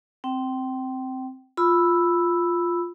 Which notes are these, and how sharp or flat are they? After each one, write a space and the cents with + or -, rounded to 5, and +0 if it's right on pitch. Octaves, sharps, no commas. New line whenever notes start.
C4 +0 G5 -25
F4 +0 B5 +0 E6 +0